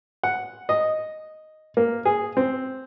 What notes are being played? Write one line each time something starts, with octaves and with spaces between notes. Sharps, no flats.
F#5
D#5
A#3
G#4
C4